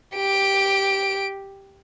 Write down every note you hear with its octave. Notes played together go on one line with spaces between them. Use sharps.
G4 D7